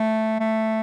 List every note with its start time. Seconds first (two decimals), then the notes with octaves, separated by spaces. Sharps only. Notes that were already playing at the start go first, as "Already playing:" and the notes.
Already playing: A3
0.40 A3